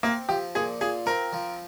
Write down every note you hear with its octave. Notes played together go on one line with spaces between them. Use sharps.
A#3 C4
F3 G4
A#2 G#4
F4 G#4
C4 A#4
F3